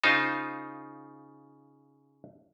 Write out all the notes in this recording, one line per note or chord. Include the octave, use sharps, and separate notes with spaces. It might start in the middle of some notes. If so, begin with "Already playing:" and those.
C#3 D#4 F4 C5